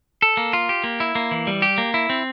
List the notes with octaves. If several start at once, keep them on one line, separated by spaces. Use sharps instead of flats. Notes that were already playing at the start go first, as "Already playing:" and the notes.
A4
A#3
F4
G4
A#3
E4
A#3
E3
G3
G4
A#3
E4
C4